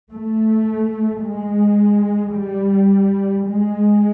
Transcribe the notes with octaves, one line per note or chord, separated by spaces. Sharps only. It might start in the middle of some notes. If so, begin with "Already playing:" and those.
A3
G#3
G3
G#3